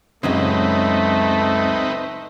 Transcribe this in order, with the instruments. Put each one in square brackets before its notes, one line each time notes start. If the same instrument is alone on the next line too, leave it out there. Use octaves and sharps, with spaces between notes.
[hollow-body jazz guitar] C#2 F#2 C#3 [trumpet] A3 [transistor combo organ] C4 D#4 B4